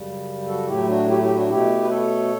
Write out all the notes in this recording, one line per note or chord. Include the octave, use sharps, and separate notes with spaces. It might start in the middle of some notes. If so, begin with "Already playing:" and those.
Already playing: F#2 C#3 G3
F#4 A4
A2 F#3 A3 E4 G4
D4 F#4
E4 G4
E4 G4
D4 F#4
B2 A3 E4 G4
B4
A4 C#5